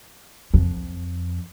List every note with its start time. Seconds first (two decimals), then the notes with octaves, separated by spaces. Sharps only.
0.54 F2